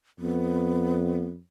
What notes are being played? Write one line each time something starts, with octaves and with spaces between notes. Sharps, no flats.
F2 B3